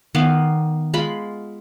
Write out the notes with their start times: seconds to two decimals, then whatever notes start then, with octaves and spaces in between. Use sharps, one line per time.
0.15 D#3 B3 F5 D6
0.94 G#3 F4 B5